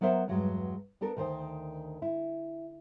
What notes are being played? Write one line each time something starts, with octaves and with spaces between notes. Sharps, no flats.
F#3 B3 A#4 C5 E5
E2 G2 F#3 G#3
B3 D4 A4 A#4
D2 D#3 A#4 C5
E4